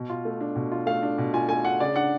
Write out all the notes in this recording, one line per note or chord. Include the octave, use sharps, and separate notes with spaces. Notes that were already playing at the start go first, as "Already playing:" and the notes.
Already playing: B2
F4
A3
D4
B2
F4
A3 F5
D4
B2
F4 G#5
A3 G#5
D4 F#5
C#3 D5
D4 F#5